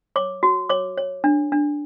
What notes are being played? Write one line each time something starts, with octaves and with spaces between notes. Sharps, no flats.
C#5 D6
F#4
C#5 D6
C#5
D4
D4